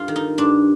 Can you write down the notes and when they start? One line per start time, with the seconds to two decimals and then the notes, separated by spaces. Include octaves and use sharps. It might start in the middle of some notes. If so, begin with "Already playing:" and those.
Already playing: G2 F4
0.08 D#3
0.16 D#4
0.38 G2 D4